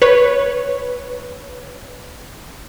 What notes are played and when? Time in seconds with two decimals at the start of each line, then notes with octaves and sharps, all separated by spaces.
0.02 B4 C#5